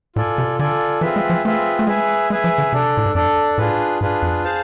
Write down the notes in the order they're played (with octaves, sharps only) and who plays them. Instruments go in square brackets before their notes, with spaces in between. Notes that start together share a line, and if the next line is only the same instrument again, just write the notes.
[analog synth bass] A2 [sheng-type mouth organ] F4 A4 D5 G#5
[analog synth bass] C3
[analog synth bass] D3 [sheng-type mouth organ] F4 A4 D5 G#5
[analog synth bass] E3 [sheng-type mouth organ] C4 F4 G#4 B4 E5
[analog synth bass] G#3
F3
[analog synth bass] A3 [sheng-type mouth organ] C4 F4 G#4 B4 E5
[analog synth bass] A3
[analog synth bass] G#3 [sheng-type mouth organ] G#4 B4 E5 G#5
[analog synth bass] G#3 [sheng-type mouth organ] G#4 B4 E5 G#5
[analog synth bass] F3
D3
[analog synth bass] C3 [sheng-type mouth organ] D4 A4 D5
[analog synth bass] A2
G#2
[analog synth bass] F2 [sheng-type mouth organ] D4 A4 D5
[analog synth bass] A2 [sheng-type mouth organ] D4 F4 G#4 B4
[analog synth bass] G#2 [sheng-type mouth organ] D4 F4 G#4 B4
[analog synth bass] F2
[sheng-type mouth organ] G#4 C5 F5 A5